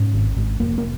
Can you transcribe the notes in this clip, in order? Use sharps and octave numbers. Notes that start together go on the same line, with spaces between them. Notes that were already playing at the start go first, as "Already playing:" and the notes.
Already playing: G#2 C#4
G#1
G#1
F1 A#3
A#3